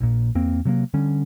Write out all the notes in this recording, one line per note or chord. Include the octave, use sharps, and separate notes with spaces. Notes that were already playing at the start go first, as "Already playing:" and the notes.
A#1 A#2
E2 A#3 C4
C3 F#3 A3 A#3
D3 G3 C#4